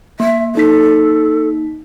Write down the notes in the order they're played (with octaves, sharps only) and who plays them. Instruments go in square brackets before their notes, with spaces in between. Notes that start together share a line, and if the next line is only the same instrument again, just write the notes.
[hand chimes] A#3 [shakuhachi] E5
[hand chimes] A#3 D#4 B6 [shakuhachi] A4